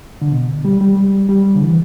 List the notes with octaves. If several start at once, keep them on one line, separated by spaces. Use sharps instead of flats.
D3
B2
G3
G3
G3
G3
D3
E3